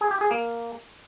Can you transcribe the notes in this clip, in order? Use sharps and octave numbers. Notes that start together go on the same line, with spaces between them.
G#4
G4
G#4
A#3